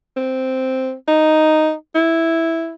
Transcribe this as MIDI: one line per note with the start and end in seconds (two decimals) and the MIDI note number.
0.17 0.93 60
1.08 1.73 63
1.95 2.73 64